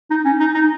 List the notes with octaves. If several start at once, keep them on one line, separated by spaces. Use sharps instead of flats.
D#4
C#4
D#4
D#4